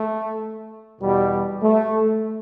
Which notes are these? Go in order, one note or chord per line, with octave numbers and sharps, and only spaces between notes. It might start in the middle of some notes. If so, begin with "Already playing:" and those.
Already playing: A3
E2 B2 G3
A3